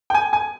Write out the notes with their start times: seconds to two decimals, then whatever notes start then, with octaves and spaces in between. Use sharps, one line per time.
0.10 G5
0.14 G#5
0.33 G#5